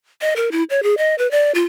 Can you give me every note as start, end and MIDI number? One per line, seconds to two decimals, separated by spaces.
0.22 0.34 75
0.36 0.50 70
0.52 0.63 64
0.70 0.83 73
0.83 0.95 68
0.98 1.15 75
1.18 1.30 71
1.31 1.52 74
1.55 1.65 65